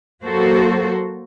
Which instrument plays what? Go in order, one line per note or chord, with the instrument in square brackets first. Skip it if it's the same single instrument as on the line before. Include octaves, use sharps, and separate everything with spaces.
[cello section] F#3 A#3 F#4 A4 C5